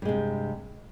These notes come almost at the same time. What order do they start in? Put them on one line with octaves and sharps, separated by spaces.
G2 G#3 C3